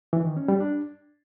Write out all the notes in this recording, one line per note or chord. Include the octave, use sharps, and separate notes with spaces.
E3
D#3
C#4
G3
D4